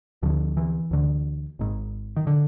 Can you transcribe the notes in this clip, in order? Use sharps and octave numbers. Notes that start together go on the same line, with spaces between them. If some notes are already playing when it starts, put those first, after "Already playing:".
D2 D3 F3
E3
D2 D3
G#1 G#2
D#3
D3